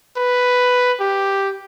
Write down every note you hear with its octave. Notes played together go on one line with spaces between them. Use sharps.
B4
G4